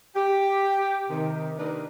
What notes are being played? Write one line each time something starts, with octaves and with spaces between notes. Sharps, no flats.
G4
C3 D#3
A#3 D4 D#4 A#4 B4